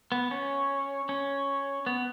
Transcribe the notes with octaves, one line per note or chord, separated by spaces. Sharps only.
B3
C#4
C#4
B3